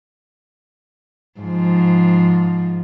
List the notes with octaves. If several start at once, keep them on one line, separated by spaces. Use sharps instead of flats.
G#2 F3